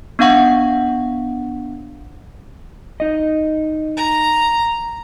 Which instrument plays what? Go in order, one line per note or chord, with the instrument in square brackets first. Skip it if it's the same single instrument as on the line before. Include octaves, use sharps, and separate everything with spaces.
[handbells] B3 D4 F5 F#5 C#6
[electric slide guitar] D#4 D#5
[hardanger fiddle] A#5